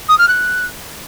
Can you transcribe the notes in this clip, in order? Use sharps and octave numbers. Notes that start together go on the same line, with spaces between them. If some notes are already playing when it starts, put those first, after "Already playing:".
D#6
F6
F#6